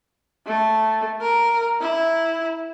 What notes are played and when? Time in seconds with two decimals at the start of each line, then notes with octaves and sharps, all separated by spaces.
0.47 A3
1.21 A#4
1.81 E4